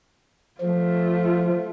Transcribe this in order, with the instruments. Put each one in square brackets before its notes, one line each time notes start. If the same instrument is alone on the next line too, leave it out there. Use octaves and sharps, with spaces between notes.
[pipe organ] F3 [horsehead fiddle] A3 F4